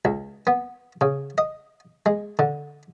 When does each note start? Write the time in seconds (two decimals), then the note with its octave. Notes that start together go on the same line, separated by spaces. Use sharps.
0.05 C#2
0.47 B3
1.01 C#3
1.38 D#5
2.06 G#3
2.39 D3